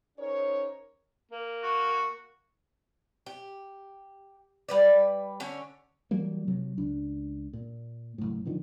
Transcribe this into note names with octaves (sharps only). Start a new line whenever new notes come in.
C#4 D#4 G#4 A#4 C5 C#5
A#3
F#4
G4
G3 B4 D5
D3 C#4
E3 F#3 G3 A#3
C3 F#3
C#2 D4
A#2
F#1 A2
B2 D3 D#3 F3